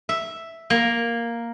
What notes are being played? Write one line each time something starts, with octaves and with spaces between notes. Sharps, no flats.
E5
A#3